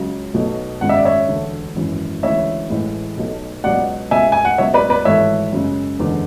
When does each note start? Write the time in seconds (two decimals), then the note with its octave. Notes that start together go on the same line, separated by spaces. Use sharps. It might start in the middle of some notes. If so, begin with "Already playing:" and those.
Already playing: C#2 C#3 F#3
0.34 B1 B2 F#3 A3
0.81 G#1 F#2 C#3 G#3 F#5
0.89 E5
0.97 D5
1.05 C#5 E5
1.29 E1 D2 D3 A3
1.76 G#1 F#2 E3
2.22 D2 C#3 E3 G#3 C#5 E5
2.70 A1 A2 E3 G#3
3.17 B1 B2 A3
3.64 C#2 B2 F#3 D5 F#5
4.11 C#2 B2 G#3 E5 G#5
4.32 G#5
4.45 F#5
4.58 C#2 B2 F#3 C#5 E5
4.74 B4 D5
4.90 B4 D5
5.05 G#1 G#2 E3 A3 C#5 E5
5.53 F#2 C#3 G#3
5.99 F#1 E2 D3 G#3